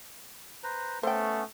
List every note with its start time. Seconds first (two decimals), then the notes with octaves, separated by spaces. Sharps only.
0.64 B4 C5 A#5
1.03 A3 B3 C#4 C5 G5